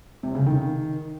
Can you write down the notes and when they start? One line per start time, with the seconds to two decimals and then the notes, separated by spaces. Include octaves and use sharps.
0.23 C3
0.35 C#3
0.46 D#3